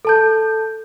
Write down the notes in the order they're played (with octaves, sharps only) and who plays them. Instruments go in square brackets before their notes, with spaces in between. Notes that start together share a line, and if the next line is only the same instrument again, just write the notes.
[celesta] A4 A5 G6